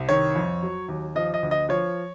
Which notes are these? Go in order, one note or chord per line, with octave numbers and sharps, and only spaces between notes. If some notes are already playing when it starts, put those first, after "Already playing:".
Already playing: C2
D#3 C#5
F2
F#3
D#2
F3 D#5
D#5
D2
D#5
F3 C#5